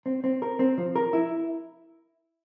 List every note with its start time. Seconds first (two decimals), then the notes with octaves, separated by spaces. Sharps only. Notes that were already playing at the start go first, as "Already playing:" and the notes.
0.06 C4
0.24 C4
0.42 A#4
0.59 C4
0.78 F3
0.96 A#4
1.13 E4